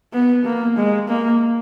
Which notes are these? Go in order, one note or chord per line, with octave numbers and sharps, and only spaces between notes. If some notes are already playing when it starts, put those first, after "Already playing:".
B3
A#3
G#3
A#3